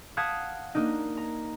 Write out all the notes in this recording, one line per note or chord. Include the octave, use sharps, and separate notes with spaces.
F5 F#5 A5 D#6 G#6 B6
A#3 D4 D#4
A#5